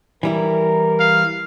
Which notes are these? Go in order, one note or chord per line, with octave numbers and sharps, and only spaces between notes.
E3 G3 E4 A#4
F5